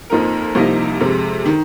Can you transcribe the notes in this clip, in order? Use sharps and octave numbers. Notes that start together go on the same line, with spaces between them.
F2 F3 A#3 D#4 A#4
C2 C3 F3 A#3 D#4
F2 C3 G#3
D#3